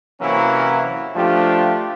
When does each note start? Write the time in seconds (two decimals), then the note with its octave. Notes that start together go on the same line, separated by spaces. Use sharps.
0.21 C3 E3 F#3 A#3 C#4 E4
1.16 F3 A3 D4 F4 G4